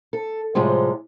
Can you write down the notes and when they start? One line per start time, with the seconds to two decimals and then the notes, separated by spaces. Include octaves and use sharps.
0.13 A4
0.55 A2 C3 F3 G3 G#3